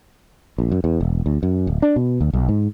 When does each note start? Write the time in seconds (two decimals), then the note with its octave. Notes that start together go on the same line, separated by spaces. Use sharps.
0.58 A#1
0.72 F#2
0.84 E2
1.01 E1
1.26 D2
1.43 F#2
1.67 D1
1.82 D4
1.96 B2
2.21 D2
2.33 B1
2.49 G#2